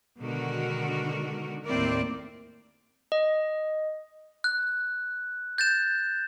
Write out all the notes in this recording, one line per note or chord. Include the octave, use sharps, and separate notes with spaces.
B2 D3 D#3 G#3 F#4 A#4
D#2 A2 C4 E4 A#4 D5
D#5
F#6
G6 A6 E7